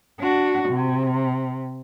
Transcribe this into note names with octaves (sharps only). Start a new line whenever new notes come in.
D4 F#4
C3